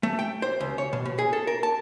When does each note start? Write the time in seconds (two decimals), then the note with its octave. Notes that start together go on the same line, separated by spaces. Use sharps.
0.03 A3
0.19 G5
0.42 C5
0.60 C#2
0.78 C#5
0.93 B2
1.06 B2
1.19 G#4
1.33 A4
1.47 A#4
1.63 A5